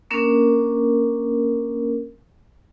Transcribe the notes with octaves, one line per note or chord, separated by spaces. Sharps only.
A#3 C#4 D4 A#4